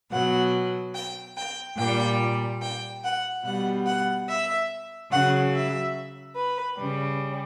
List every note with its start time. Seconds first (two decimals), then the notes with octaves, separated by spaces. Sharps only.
0.11 B2 F#3 F#5
0.94 G5
1.37 G5
1.77 A#2 G5
1.83 G3
2.62 G5
3.03 F#5
3.44 B2 G3 F#5
3.86 F#5
4.28 E5
5.11 C#3 F#3 F#5
5.53 E5
6.36 B4
6.78 C#3 G3